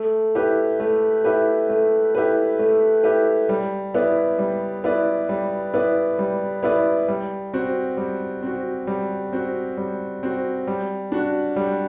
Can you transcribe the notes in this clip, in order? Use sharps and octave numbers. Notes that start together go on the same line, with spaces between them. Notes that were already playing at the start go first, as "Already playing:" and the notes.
Already playing: A3
E4 G4 B4
A3
E4 G4 B4
A3
E4 G4 B4
A3
E4 G4 B4
G3
B3 E4 B4 D5
G3
B3 E4 B4 D5
G3
B3 E4 B4 D5
G3
B3 E4 B4 D5
G3
C4 F#4
G3
C4 F#4
G3
C4 F#4
G3
C4 F#4
G3
D4 F#4
G3